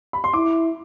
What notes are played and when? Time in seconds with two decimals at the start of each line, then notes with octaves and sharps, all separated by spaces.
0.13 B5
0.24 C6
0.33 E4 D6